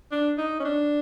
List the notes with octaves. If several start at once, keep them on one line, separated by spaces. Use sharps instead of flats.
D4
D#4
C#4
D4